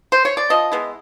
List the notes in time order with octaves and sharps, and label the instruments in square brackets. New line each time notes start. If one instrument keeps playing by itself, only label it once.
[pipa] C5
C#5
D5
F3 D#5
G#3 B3 E4